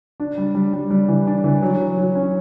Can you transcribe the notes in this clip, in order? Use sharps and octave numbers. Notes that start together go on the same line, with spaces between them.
D4
G3
G3
G3
G3
E3
D4
E3
F#3
F#3
F#3
C#4